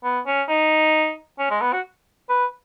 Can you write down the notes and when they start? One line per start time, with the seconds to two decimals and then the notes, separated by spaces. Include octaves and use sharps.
0.03 B3
0.26 C#4
0.48 D#4
1.39 C#4
1.50 G#3
1.61 B3
1.72 F#4
2.29 B4